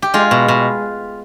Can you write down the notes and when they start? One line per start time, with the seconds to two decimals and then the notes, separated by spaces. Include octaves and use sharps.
0.02 G4
0.14 G#3 F4
0.31 B2
0.48 B2